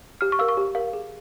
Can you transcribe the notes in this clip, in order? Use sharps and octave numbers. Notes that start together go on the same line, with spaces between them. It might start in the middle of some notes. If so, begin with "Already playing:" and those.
G4 F6
C#6
A#4 F5 E6
C#6
G4
A#4 F5
G#4